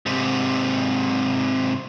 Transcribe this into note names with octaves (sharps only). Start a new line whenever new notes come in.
G#2 C3